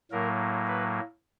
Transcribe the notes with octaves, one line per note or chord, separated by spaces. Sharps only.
A2 F#3 A#3 A#4
B4